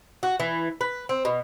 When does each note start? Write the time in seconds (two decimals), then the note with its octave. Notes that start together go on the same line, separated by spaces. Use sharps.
0.23 F#4
0.40 E3
0.81 B4
1.09 C4
1.25 B2